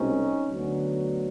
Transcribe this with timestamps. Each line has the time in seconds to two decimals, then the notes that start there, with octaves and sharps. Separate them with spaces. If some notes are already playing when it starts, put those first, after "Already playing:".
Already playing: C2 B2 G#3 C4 C#4 D#4
0.51 D2 D3 F#3 B3